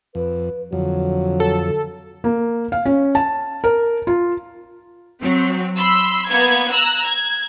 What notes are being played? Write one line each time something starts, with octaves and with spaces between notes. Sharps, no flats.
F2 B4
F2 D3 F#3
A4
A#3
F5
C#4
A5
A#4
F4
F#3 C4
B5 C6 E6
A#3 B3 G#6
A#5 E6 F#6
G#6